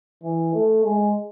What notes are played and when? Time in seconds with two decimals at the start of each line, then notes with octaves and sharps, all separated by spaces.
0.23 E3
0.54 A3
0.84 G#3